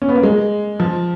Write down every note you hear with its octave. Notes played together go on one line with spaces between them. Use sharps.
C#4
B3
A#3
G#3
F3